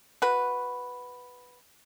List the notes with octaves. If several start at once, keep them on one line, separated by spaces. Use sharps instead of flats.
F#4 B4